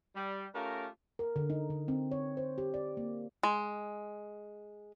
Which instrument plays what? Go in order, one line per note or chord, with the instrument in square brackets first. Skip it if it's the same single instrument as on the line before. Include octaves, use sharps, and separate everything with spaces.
[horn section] G3
A3 C#4 F4 G4 A#4
[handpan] A#4
D3
D#4
D3
C4
C#5
C5
G4
D5
A#3
[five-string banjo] G#3